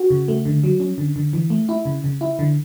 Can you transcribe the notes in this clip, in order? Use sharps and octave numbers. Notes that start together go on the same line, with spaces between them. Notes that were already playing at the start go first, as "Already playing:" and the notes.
Already playing: F#4
C#3
A3
D3
F#3
C#4
D3
D3
E3
A3
E4
C#3
C#3
E4
D3